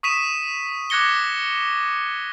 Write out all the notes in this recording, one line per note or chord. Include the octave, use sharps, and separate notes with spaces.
C#6 D#6 B6 D#7 E7
D6 F#6 G#6 A#6 C#7 G7